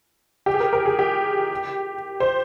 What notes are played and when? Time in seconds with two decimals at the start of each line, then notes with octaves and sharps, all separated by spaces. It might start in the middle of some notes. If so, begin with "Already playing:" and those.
0.46 G4
0.54 G#4
0.60 A#4
0.73 A#4
0.86 G#4
0.99 G4
2.20 C5